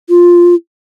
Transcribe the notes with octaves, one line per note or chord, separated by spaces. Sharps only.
F4